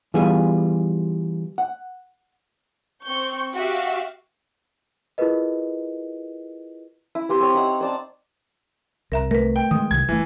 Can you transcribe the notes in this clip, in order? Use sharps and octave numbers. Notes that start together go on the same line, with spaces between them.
E3 G3 B3 F4 G#4
F#5
C4 C#6 G6
F#4 G4 E5 F5
E4 F4 G#4 A#4 B4 D#5
E4
C4 G4 C5
C4 C#5
D#4 F#5
C5 D5 A5
C2 A#4 E5 A#5
A3 A#4 B4
G5
D#3 E3 G#3 D#6
C2 C3 D#3 G#6
F#1 E3 A3